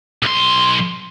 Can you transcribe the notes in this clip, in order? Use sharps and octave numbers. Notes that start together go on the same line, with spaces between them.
B1 C6